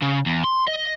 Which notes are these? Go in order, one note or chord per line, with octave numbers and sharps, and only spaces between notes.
C#3
E2
C6
D#5